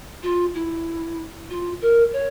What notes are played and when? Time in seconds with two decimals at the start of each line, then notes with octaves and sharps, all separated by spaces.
0.23 F4
0.54 E4
1.50 F4
1.81 A#4
2.13 C#5